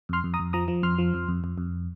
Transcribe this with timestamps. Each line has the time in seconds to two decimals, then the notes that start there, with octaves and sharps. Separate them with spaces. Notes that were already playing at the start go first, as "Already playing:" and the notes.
0.09 F2 C6 F6
0.24 F2
0.34 A#5 D#6
0.39 F2
0.53 F3 A#5 D#6
0.68 F3
0.83 F2 C6 F6
0.98 F3
1.14 F2
1.29 F2
1.44 F2
1.58 F2